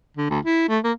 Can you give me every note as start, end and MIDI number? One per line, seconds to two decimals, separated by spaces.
0.17 0.29 50
0.30 0.39 38
0.45 0.67 64
0.69 0.79 57
0.84 0.92 58